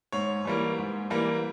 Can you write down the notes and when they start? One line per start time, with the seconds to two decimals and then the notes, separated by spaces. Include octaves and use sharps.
0.12 G#2 C#5
0.45 E3 G3 A#3
0.78 G#2
1.10 E3 G3 A#3